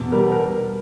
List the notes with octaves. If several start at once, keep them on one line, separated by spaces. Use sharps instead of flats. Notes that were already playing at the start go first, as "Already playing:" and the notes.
Already playing: E2 B2
G3 A#4
A#4